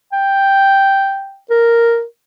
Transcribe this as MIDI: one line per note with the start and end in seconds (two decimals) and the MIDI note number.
0.12 1.38 79
1.50 2.04 70